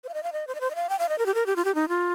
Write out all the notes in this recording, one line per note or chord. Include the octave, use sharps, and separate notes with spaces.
C5
F5
D#5
F5
D#5
C5
D#5
C5
D#5
F5
G5
F5
D#5
A#4
G4
A#4
G4
F4
G4
D#4
F4